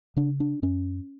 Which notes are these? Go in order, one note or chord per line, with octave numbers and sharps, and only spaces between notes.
C#3 D4
D4
F#2 C#4